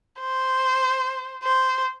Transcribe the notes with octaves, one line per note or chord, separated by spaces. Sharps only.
C5
C5